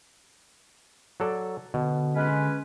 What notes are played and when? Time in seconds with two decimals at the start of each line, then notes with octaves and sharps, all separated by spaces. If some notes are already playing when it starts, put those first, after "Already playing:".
1.20 F#3 A4 D5
1.74 B2 D3
2.16 G#3 C#4 B4